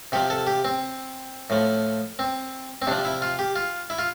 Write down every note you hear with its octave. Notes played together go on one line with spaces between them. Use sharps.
C3 F3 G4
A4
G4
C4
A2 F3
C4
C4
C3 F3 D4
E4
F4
G4
F4
E4
F4